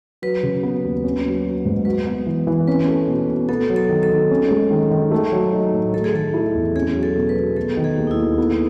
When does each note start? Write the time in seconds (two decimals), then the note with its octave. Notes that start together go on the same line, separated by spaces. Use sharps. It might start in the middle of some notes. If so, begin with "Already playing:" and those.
0.22 F#3 B4
0.43 C#3
0.63 B3
0.84 D#2
1.04 C#4
1.25 F#3
1.46 F#4
1.65 G#2
1.85 F#4 B4
2.07 B3
2.26 E3
2.47 E3
2.68 C#4 B4
2.88 A3
3.08 B2
3.28 B2
3.49 B3 A4
3.70 F#3
3.76 A4
3.89 D#3
4.03 A4
4.10 D#3
4.31 C#4
4.51 G#3
4.71 D#3
4.91 D#3
5.11 A3
5.32 F#3
5.52 D#4
5.74 A2
5.94 A3 A4
6.04 G#4
6.14 D#3 A4
6.34 E4
6.55 E2
6.76 C#4 G#4
6.95 F#3
7.03 A4
7.15 B2
7.29 B4
7.36 B2
7.56 A3 A4
7.77 D#3
7.84 G#4
7.97 D#2
8.07 D#4
8.11 E4
8.18 D#2
8.38 B3